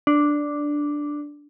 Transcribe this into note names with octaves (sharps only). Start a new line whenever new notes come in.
D4